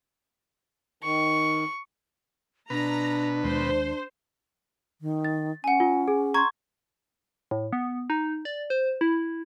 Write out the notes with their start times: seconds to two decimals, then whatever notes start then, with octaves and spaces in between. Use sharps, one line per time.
1.03 D#3 C#6
2.70 B2 D4 B4 A#5
3.44 D#2 G#3 C5
5.01 D#3
5.25 A6
5.64 C#4 F#5 G#5
5.80 F4
6.08 G#4
6.34 A#5 C6 C#6 G#6
7.51 A2
7.73 B3
8.10 D#4
8.45 D5
8.70 C5
9.01 E4